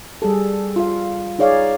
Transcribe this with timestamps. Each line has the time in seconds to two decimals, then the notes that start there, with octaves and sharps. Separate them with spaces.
0.22 G3 G#4 A4
0.76 F4 F5
1.39 D#4 G#4 C#5 D5 F5